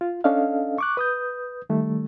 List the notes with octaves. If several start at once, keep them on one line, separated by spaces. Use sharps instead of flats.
F4
C#4 D4 A4 D#5 F5
C#6 D6 F#6
B4 D#6 G6
D#3 G3 A3